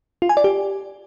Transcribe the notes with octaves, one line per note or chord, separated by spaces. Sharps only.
F4
G#5
D5
G4